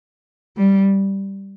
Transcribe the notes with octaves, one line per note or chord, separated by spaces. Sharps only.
G3